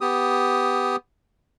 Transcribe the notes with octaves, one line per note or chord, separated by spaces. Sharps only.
B3 G4 D#6